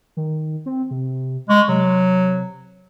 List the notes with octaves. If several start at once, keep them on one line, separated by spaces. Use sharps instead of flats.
D#3
C4
C3
G#3 C#6
C3 F#3